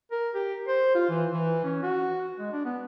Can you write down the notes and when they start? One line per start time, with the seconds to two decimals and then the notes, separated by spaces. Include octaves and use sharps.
0.11 A#4
0.35 G4
0.68 C5
0.95 F4
1.09 E3
1.32 E3
1.64 C#4
1.83 F#4
2.38 G#3
2.52 D4
2.65 B3